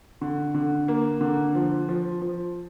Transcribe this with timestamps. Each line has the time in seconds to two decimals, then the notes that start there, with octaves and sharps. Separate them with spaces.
0.21 D3
0.54 D3
0.88 A#3
1.21 D3
1.55 F3
1.89 F3
2.22 F3